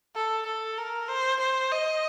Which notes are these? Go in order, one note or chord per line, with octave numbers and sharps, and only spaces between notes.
A4
A4
A#4
C5
C5
D#5